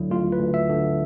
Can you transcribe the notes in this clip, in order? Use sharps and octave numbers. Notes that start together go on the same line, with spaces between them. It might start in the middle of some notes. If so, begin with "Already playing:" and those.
Already playing: D2 D3 F#3 E4
D2 F4
B4
D2
E5
D3